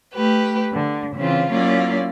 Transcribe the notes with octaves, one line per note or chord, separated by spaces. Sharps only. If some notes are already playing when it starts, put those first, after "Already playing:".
A3 G4 B4
D3
C#3 E3 C4 F4
F#3 A#3 C#4 E4 F4 D5